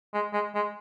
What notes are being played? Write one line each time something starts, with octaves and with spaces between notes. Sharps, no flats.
G#3
G#3
G#3